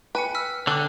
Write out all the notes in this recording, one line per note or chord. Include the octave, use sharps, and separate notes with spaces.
B4 G5 G#5 C#7
E6 F6 B6
D3 D4 G5 F#6